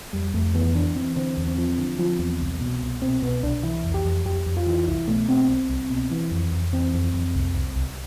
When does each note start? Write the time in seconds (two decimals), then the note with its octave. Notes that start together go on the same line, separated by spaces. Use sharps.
0.13 F2 G3
0.34 F2 A3
0.55 E3 B3
0.75 E3 D4
0.96 E3 C4
1.16 D3 C4
1.37 E2
1.48 C4
1.58 F3
1.78 D3
1.99 F3
2.19 E2
2.40 C2
2.61 B2
2.82 C2
3.02 B2 C4
3.22 B2 B3
3.43 C2 D4
3.63 E3 E4
3.85 F2
3.94 G4
4.05 F2
4.25 F2 G4
4.46 F2
4.57 F4
4.67 E3
4.87 C2 E4
5.08 B2 A3
5.29 B2 C4
5.49 C2
5.70 C2
5.90 B2
6.11 E3
6.31 F2
6.52 F2
6.73 E3 C4
6.94 F2
7.14 F2
7.35 C2
7.55 C2
7.76 C2